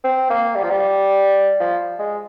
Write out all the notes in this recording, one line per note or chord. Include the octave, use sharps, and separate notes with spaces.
C4
A#3
G3
F3
G3
F3
G#3